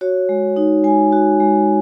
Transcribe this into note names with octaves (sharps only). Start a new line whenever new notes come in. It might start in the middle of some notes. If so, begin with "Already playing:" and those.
F#4 C#5
G#3
D#4
G#3 G#5
F#4
G#3